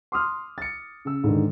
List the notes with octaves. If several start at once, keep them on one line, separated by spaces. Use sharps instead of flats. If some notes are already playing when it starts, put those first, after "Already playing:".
C6 D6 D#6 F6
A6 C#7
C#3 E6
G#2 D3 D#3